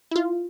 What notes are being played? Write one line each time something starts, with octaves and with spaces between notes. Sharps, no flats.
E4
F4